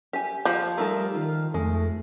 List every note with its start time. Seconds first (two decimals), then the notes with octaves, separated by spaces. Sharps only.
0.13 G4 G#5
0.45 F3
0.78 G3 A3 D#4 A4 A#4
1.15 D#3 F4
1.54 F2 G#3 A3